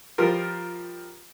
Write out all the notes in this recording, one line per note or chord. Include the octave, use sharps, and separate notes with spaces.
F3 G3 F4 A#4